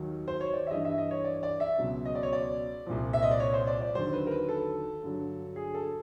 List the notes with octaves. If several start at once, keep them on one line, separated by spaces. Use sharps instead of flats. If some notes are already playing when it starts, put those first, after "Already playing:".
Already playing: D#2 D#3 F#3
C5
C#5
D5
E5
G2 E3 G3 D#5
E5
D#5
C#5
D5
D5
E5
C#2 B2 F#3
D#5
D5
C#5
D5
C2 A#2 F3
E5
D#5
D5
C#5
C5
D5
D5
D#2 D3 F#3 C5
B4
A#4
B4
A4
G2 D3 F#3
G#4
A4